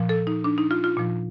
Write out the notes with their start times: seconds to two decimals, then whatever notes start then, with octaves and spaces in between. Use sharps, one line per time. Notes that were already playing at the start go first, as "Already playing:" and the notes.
Already playing: A#2 F3
0.09 A4
0.27 D#4
0.44 D4
0.58 D#4
0.71 F4
0.84 F4
0.97 A#2 F3